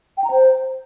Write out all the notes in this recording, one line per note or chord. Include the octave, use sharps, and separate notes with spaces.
G5
A#5
C5